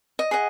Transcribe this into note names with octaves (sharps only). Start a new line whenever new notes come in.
D#5
G#4 D#5 F#5